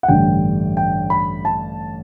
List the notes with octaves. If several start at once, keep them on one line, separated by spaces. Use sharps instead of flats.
F#5
A1 G2 D3 G3 G5
G5
B5
A5